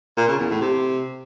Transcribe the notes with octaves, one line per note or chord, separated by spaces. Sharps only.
A#2
C#3
E2
A2
C3